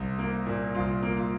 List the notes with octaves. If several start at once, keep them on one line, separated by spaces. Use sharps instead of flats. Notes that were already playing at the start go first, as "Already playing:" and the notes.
Already playing: C2
A#3
A#2
C2 F4
A#3
F4